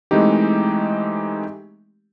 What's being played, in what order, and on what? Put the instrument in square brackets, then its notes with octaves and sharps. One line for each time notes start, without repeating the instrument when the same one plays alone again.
[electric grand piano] E3 G#3 A3 C4 D#4 G4